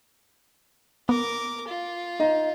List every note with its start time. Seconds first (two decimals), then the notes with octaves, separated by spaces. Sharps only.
1.09 B3 A#4 D6
1.68 F4
2.19 D#4 D#5